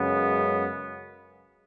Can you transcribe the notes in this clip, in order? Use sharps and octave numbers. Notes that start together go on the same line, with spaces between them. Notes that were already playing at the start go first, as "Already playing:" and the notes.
Already playing: F#2 C#3 G#3 B3